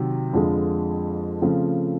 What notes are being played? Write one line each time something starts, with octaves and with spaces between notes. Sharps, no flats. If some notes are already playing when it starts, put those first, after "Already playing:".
Already playing: C3 D#3 F#3
F2 D3 F3 G#3
C#3 F3 A3 C4